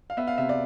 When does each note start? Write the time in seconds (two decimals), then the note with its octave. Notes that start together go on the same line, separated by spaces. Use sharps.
0.10 F5
0.17 B3 E5
0.27 F5
0.38 C3 E5
0.49 D5